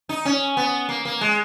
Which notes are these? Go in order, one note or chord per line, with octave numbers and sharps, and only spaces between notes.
D#4
C#4
B3
A#3
A#3
G#3